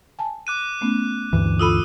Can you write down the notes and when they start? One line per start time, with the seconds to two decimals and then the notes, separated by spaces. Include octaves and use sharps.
0.19 G#5 A5
0.47 D6 F#6 D#7
0.81 A3 B3 C#4
1.33 D2 G2 E3
1.59 F4 A4 B5 D#6 E6 D#7